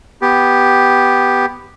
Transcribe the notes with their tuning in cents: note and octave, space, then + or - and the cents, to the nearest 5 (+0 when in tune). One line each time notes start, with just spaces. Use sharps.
B3 +0 G4 +0